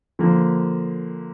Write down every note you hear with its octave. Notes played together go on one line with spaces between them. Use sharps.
D3 F3 A#3